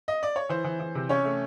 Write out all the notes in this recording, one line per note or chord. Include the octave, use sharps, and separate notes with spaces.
D#5
D5
C#5
E3 C5
E3
E3
C3
C#4 C#5
A3